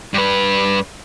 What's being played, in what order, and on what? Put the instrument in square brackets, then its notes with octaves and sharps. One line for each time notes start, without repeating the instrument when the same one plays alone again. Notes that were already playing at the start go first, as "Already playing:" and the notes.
[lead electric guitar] G2 B4